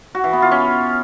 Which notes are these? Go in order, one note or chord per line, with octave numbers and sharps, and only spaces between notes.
F#4
E3
B3
F4
C#4